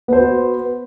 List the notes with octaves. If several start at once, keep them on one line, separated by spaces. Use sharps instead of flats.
B3 F#4 C5